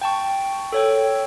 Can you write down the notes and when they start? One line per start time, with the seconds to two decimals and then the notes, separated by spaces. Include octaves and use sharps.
0.02 G5 A5 C#6
0.72 A4 C#5 G5